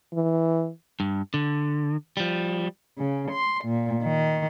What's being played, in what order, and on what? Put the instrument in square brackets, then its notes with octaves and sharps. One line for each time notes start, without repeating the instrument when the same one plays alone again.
[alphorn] E3
[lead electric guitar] G2
D3
F3 G3
[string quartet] C#3
C6
A#2
D#3